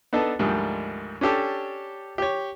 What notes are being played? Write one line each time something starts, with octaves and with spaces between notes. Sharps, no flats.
B3 D4 D#4 A4
D2 G#2 D#3 F3 G3
C#4 D4 G4 A4
G4 C#5